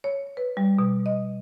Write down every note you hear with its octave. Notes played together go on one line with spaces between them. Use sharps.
C#5
B4
G3
B2
D#5